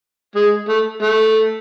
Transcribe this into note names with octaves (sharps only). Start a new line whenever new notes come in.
G#3
A3
A3